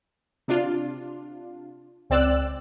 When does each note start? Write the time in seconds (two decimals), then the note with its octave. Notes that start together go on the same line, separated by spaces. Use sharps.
0.48 C3 D4 F4
2.10 C#2 C4 D5 E6 F#6